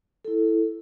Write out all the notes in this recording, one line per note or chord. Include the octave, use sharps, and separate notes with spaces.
E4 A4